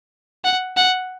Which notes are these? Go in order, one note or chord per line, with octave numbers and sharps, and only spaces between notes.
F#5
F#5